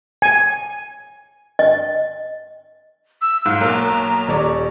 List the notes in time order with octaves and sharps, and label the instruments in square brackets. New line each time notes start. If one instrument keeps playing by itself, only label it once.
[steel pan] G#5
[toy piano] D#5
[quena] E6
[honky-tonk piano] G#2 [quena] F5
[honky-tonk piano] B1 [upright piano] A#3 [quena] A#5
[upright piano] D#1 C#5 D5